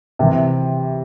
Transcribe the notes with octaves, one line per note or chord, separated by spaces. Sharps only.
C3 E3